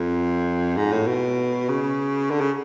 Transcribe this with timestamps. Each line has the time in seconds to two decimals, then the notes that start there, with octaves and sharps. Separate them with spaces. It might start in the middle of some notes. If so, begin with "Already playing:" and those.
Already playing: F2
0.77 G#2
0.92 A2
1.07 B2
1.69 C#3
2.31 D3
2.41 C#3